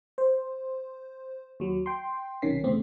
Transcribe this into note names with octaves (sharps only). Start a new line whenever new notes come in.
C5
D#2 F#3
G5 C6
B1 C3 D#3 C#4 B6 C7
E2 C#3 A3 C4